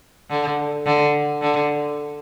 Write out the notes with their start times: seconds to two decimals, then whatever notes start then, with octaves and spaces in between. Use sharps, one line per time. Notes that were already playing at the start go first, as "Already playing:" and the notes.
0.30 D3
0.86 D3
1.42 D3